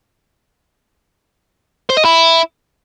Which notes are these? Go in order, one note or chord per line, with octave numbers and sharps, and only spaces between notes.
C5
D#5
E4